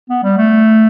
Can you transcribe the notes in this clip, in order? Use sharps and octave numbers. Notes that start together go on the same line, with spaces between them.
B3
G3
A3